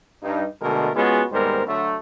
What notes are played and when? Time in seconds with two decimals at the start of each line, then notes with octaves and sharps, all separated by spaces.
0.23 G2 D#4
0.61 B2 D3 G#3 A3 A4 A#4
0.95 G#3 B3 C#4 F4 F#4 G#4
1.32 D#2 G#2 G3 B3 A#4 C5
1.67 D3 F#3 A3